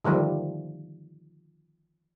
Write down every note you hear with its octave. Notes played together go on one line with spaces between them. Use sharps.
D3 D#3 F3 G3 A3